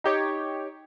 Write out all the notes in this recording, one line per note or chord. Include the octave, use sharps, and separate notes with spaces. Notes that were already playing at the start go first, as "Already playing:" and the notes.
D#4 G4 C#5